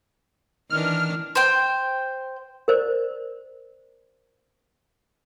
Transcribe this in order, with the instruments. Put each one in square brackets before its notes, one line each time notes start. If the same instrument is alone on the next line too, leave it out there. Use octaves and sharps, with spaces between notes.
[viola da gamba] D#3 E3 D4 [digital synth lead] F6
[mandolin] C5 G5
[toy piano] A#4 C5 D5